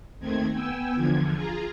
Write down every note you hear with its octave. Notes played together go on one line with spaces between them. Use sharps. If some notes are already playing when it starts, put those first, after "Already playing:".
D#2 D#3 A3 C4 G#6
B3 G5 G#5 E6
E2 D3 F3 G#6
F4 G#4 A#5